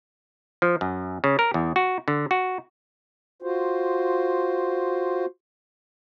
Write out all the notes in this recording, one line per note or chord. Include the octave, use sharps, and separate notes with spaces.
F3
F#2
C#3
A#4
E2
F#4
D3
F#4
F4 F#4 C5